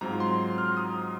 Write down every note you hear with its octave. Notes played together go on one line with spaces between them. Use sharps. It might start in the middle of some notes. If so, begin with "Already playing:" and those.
G#2 F#3 C4 F4 A#5
C6
F6
D#6